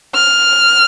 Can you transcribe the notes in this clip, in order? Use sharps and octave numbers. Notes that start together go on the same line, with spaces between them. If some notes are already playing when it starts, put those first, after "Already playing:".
F6